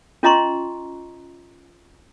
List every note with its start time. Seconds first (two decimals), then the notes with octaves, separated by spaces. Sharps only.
0.23 C#4 F4 D#5 A#5 C6 C#6